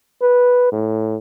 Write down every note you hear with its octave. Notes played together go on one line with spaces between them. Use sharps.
B4
A2